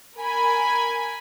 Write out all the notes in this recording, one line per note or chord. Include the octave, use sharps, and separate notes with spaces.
A#4 G#5 B5